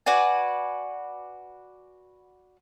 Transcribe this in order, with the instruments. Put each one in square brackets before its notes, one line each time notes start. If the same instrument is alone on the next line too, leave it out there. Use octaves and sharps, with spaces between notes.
[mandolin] F#4 B4 D5 G#5